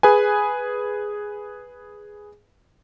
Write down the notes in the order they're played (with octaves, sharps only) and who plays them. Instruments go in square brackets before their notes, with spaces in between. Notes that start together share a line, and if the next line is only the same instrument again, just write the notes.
[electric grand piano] G#4 B4 G#5